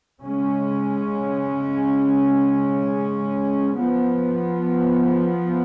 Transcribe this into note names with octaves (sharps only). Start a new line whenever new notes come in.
C#3 G#3 C#4
F3 B3